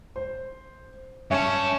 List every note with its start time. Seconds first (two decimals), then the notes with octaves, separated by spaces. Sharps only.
0.16 C5
1.31 G2 C#4 E5 A5